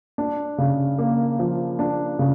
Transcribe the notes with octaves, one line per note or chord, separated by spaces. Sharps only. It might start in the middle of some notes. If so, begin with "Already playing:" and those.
D4
C#3
A#3
F3
D4
C#3